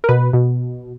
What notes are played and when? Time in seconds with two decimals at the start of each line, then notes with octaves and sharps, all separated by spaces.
0.04 A#4
0.09 B2 B4
0.33 B2